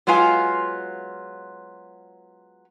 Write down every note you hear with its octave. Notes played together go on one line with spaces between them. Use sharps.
F#3 G#3 B3 F4 F5 G#5